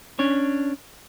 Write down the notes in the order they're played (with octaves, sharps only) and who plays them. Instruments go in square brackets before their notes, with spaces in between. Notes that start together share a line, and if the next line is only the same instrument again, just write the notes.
[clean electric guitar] C#4 D4 C#5